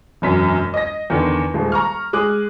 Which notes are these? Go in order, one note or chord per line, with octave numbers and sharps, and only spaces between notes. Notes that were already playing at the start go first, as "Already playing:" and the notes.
E1 F#2 B6
D#5 A#6
E2 D3 D#3
D#1 G#3
A#5 C#6 F6
G#3 G#4 D6 D#6 F#6